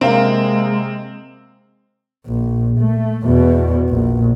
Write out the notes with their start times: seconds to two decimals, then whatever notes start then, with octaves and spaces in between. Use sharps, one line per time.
0.01 C3 G#3 A#3 C4 F5
2.27 A#1
2.80 A3
3.24 E2 B2
3.89 A#1